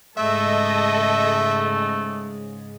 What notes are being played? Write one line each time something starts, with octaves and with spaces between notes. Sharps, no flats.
G#2 C#3 G#3 A3 A4 D#5 E5